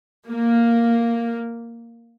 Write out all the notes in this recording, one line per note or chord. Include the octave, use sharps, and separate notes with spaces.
A#3